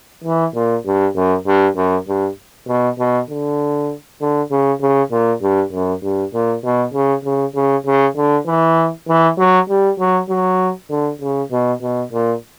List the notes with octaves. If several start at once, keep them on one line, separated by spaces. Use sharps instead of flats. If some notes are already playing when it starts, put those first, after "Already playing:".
E3
A#2
G2
F#2
G2
F#2
G2
B2
B2
D3
D3
C#3
C#3
A#2
G2
F#2
G2
A#2
B2
C#3
C#3
C#3
C#3
D3
E3
E3
F#3
G3
F#3
F#3
D3
C#3
B2
B2
A#2